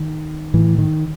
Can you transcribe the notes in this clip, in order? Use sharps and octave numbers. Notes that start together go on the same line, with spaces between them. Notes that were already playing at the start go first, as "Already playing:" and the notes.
Already playing: D#3
A2 E3
D#3